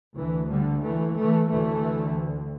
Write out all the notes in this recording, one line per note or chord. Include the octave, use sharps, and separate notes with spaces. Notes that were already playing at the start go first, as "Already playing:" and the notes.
D2 E3
D3 G3
E3 A3
E3 A3
D2 E3 A3